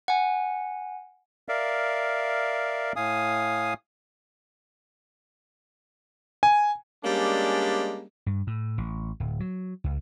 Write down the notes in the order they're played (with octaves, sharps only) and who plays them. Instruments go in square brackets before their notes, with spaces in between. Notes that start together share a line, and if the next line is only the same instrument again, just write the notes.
[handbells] F#5 G#5
[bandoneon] A#4 D5 E5 F5
A2 F5 G#5 D#6
[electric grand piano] G#5
[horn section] G3 G#3 A#3 C#4 D4
[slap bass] G2
A2
A1
D1
F#3
C#2